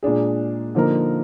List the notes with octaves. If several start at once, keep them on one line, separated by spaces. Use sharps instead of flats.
A#2 G#3 D4 G#4
D3 F3 A#3 D#4 A#4